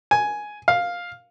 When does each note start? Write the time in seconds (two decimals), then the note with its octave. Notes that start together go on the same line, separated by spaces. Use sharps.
0.11 G#5
0.68 F5